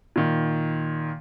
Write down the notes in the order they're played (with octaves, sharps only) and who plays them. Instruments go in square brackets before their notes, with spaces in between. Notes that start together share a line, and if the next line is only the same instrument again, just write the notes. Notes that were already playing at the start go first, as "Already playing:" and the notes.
[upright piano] A#2 D#3